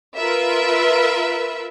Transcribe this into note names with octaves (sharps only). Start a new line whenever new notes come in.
F4 A#4 B4 E5